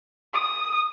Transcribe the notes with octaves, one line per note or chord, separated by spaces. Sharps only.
D#6